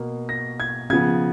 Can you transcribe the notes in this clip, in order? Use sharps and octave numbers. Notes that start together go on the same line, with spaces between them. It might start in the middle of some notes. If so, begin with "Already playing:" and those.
Already playing: B2 A#3
A#6
G#6
C#3 F3 B3 G#6